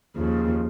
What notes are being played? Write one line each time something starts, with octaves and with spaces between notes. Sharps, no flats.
D#2 C#3 F3